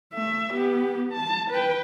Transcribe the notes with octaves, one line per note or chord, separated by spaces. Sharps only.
A3 E5
B3 G4
A5
B4 G5